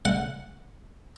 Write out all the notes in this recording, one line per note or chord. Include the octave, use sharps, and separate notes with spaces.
F#5